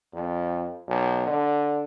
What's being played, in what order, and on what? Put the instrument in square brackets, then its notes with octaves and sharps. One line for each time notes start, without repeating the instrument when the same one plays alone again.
[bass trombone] F2
B1
D3